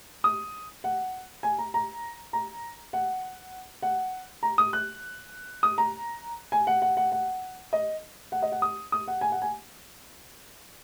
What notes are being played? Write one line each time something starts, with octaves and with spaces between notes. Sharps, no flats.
D#6
F#5
G#5
A#5
A#5
A#5
F#5
F#5
A#5
D#6
F#6
D#6
A#5
G#5
F#5
F#5
F#5
F#5
D#5
F#5
D#5
F#5
D#6
D#6
F#5
G#5
F#5
G#5